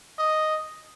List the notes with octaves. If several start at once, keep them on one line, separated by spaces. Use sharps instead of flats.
D#5